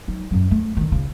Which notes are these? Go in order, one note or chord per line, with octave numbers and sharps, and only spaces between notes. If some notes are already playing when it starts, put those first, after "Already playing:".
F#3 D#4
F#2 F#3
A3
D3 D#3
C#2 C#3